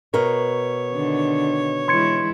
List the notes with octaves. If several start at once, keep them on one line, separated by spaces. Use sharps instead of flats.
B2 A#4 C#5
D3 D#3
E3 G#3 E4 C6 G#6 C#7